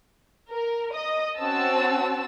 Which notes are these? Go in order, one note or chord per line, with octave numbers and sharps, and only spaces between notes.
A#4
D#5 D#6
C4 C#4 F#4 A5 E6